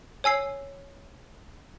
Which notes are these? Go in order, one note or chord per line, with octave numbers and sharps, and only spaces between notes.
C#5 G#5 E6 C7